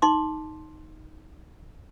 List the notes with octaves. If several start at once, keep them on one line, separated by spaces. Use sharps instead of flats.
D#4 C6 D6